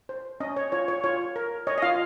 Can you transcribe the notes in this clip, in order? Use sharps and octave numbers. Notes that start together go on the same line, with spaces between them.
C5
C#4 D#5
C#5
F4 C#5
C#5
F4 C#5
A#4
C#5 D#5
D#5
F4 F5